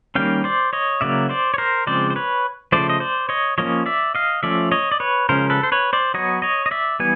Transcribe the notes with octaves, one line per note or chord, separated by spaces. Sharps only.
D#3 G3 A#3 C#4 F5 G5
C5 D5
C#5 D#5
C#3 F#3 A#3 D5 E5
C5 D5
C#5
A#4 C5
C#3 F3 G#3 C4 C5 D5
C5
B4 C#5
C#3 F3 A3 C5 D5
D#5
C5 D5
C#5 D#5
F3 A#3 C#4 C#5 D#5
D5 E5
D#5 F5
F3 A3 C#4 D5 E5
C#5 D#5
D5
B4 C#5
C#3 F3 G#3 C#4 A#4 C5
A4 B4
C5
B4 C#5
C5 D5
F#3 B3 C#5 D#5
C#5 D#5
D#5
D5 E5
E3 G3 B3 G#5